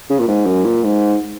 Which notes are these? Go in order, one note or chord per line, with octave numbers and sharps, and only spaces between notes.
C#3
A#2
G#2
F#2
A#2
G#2